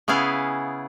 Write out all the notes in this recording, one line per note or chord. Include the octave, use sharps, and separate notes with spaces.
C#3 B3 E4 G#4 F5